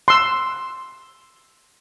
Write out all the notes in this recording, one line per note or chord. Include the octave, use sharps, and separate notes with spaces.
C6 E6